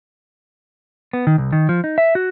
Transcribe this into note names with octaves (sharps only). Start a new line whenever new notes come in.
B3
D#3
C2
D#3
F3
D#4
E5
F#4